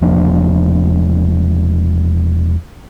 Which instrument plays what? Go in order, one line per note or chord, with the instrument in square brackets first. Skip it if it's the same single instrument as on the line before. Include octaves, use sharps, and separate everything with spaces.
[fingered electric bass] E1 F3 A#3 D4